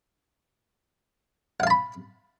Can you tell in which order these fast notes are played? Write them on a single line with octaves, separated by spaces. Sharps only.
F#5 F5 A5 B5